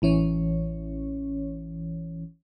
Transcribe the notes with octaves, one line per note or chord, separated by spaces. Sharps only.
A1 E3 C#4 C#5